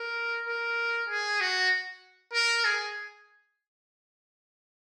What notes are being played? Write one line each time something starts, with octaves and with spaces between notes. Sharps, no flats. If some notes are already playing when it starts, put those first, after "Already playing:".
Already playing: A#4
A#4
G#4
F#4
A#4
G#4